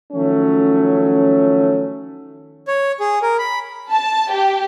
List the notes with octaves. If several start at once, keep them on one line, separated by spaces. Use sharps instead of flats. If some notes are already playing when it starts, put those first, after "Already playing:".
D#3 F3 F#3 A3 C#4
C#5
G#4
A#4
B5
A5
G4